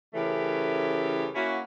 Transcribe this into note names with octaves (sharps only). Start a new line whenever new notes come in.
C#3 E3 A3 C#4 G4 A#4
A#3 C#4 E4 F#4